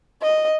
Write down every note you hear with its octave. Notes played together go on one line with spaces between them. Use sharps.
D#5